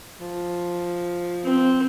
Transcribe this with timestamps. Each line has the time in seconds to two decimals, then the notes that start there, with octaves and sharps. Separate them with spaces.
0.20 F3
1.44 C4